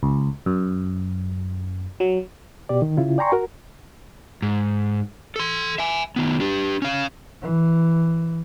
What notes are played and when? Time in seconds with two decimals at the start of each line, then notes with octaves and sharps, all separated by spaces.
0.03 C#2
0.46 F#2
2.00 F#3
2.69 B2 G4 D5
2.82 D#3
2.97 C#3 E4 F4
3.18 D5 G5 G#5 A#5 C6 C#6
3.32 F#4 A#4
4.42 G#2
5.36 A4 C6
5.78 E5 G#5
6.16 D#3 B3
6.40 D4 G4
6.82 C#4 F5
7.42 E3